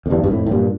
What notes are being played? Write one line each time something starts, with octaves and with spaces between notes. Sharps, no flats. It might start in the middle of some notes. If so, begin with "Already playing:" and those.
F2
E2 G2
G2
F2 A2
A2
G2 A#2